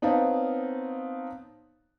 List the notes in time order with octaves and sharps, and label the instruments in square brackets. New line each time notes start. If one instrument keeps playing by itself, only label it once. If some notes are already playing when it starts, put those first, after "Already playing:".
[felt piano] B3 C4 D#4 C#5 F5 A5